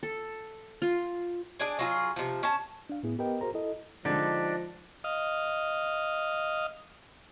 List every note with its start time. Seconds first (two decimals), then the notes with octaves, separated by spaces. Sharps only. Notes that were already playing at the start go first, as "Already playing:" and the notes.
0.03 A4
0.82 F4
1.60 D4 G#4 D5 G#5
1.79 F#3 F4 G#4
2.16 C3 F3
2.43 C#4 A5
2.90 D4 F5
3.03 A2 B3 E4 G#4
3.18 B3 G4 A#4 B4 D#5 G5
3.41 F#4 G#4 A#4 C5 A#5
3.54 E4 A4 D#5
4.05 D3 F3 G#3 D4 D#4 G4 D5
5.04 D#5 F5